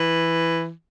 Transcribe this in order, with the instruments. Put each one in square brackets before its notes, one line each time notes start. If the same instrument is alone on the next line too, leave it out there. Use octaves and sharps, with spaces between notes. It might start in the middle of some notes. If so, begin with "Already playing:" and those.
Already playing: [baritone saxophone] E3